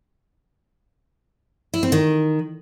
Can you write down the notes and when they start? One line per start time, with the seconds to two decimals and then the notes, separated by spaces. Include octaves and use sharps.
1.74 E4
1.83 C4
1.92 D#3